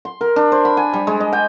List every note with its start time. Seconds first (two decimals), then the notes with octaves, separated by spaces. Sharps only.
0.05 C6
0.21 A#4
0.36 D4
0.52 C5
0.65 B5
0.77 G#5
0.93 G3
1.07 G#3
1.20 D#5
1.33 G5